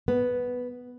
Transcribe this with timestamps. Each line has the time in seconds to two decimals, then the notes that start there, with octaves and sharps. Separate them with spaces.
0.08 B3